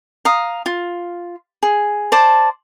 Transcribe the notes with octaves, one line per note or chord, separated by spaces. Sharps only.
F5 A#5 D#6
F4
G#4
C5 D5 A5